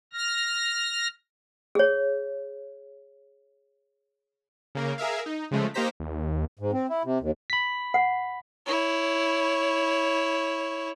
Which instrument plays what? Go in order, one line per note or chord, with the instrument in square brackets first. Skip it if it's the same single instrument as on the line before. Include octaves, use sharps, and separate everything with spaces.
[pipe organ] F6 A#6
[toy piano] G#4 C#5
[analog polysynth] C#3 A#3 A#4
G#4 A#4 E5 F5
D#4
C#3 F3 G#3 A3
A#3 D#4 G4 C5 A#5 B6
[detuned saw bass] D#2
[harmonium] G#2
C4
E4
C3
D#2
[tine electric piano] B5 B6
[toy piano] F#5
[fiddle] E4 C#5